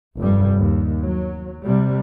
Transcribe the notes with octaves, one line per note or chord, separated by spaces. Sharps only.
F1 G2 G3
D#2
F#3
C3 G3